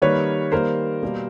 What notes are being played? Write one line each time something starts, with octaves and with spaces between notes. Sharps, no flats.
D#3 G3 A#3 B4 C#5
D#3 G3 A#3 A#4 C5
B2 G3 A#3